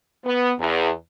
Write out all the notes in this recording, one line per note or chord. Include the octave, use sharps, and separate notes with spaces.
B3
E2